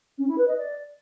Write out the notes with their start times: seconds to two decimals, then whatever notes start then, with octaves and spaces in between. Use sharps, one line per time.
0.18 C#4
0.28 E4
0.38 B4
0.48 D#5
0.57 D5